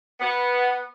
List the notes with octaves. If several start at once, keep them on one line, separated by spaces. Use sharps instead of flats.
B3